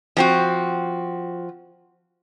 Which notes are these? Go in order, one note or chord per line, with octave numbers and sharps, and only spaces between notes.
F3 C4 F#4